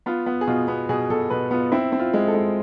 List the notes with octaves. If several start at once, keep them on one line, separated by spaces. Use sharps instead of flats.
B3 F4
B3
G#4
B2 F4
B3
B2 G#4
B2 A4
B2 B4
B3 F4
C4 E4
C4
F4
G#3
A4
G#3